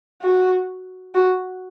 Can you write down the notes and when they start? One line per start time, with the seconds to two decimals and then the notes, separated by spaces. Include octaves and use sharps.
0.22 F#4
1.15 F#4